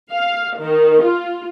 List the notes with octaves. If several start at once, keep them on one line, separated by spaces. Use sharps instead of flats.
F5
D#3
F4